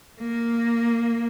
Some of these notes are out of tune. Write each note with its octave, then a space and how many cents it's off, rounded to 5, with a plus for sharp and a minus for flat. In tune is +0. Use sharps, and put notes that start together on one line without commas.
A#3 -5